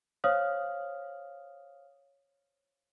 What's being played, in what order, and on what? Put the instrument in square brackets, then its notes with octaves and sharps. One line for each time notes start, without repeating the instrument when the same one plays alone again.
[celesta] C5 C#5 F5 D#6 F6